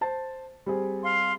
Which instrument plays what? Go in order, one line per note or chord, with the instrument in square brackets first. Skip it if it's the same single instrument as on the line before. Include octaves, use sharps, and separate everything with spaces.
[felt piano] C5 A5
G3 C4 G#4
[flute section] F5 C6